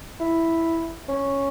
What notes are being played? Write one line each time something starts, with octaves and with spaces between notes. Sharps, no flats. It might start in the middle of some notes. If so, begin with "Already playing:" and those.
E4
C#4